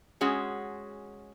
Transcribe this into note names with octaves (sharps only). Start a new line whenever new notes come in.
G#3 C#4 F#4 G#4